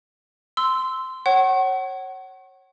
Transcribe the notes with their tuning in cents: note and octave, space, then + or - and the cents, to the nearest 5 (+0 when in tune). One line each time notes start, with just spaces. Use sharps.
C6 -15 E6 -5
C#5 -25 F#5 +30 C#6 -30